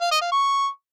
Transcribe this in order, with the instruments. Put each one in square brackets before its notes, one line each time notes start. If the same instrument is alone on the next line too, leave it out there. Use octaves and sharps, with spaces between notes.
[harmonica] F5
D#5
F5
C#6